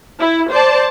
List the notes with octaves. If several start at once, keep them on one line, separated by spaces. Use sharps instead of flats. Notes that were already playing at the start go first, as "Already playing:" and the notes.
E4
C5 D5 A5